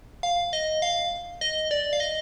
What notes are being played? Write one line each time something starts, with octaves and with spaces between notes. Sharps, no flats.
F5
D#5
F5
D#5
D5
F5
D#5